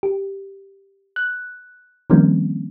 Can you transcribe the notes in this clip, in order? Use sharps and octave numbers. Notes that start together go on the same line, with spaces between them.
G4
F#6
D#3 F3 G3 A#3 C4 C#4